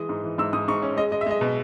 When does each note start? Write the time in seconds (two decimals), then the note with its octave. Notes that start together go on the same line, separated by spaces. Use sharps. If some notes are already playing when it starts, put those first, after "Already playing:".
Already playing: E3 G#3 D#6
0.09 G#2
0.24 E3
0.38 G#2 E6
0.53 G#2 D#6
0.68 G#2 C#6
0.82 C#4
0.97 G#3 D#5
1.12 G#3 D#5
1.21 E5
1.26 G#3 D#5
1.41 B2